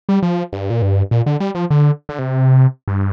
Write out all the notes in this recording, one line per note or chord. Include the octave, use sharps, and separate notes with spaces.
G3
F3
G2
A#2
G2
A#2
D3
G3
F3
D3
D3
C3
G2